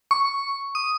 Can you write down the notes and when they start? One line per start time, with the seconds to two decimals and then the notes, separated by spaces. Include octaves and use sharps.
0.11 C#6
0.75 D#6